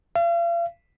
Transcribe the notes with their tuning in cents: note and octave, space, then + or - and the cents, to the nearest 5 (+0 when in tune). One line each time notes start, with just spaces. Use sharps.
F5 -40